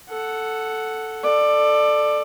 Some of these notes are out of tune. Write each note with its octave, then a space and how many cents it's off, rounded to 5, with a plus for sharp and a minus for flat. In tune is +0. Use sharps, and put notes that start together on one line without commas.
A4 +0 F#5 +0
A4 +0 D5 +20